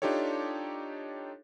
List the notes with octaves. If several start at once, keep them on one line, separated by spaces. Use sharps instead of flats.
D4 D#4 F4 G4 A4 C#5